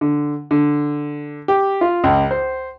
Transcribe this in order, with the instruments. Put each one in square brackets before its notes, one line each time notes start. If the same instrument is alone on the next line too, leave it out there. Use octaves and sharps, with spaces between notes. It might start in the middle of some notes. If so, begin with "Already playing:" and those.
[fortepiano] D3
D3
G4
F4
C#2
C5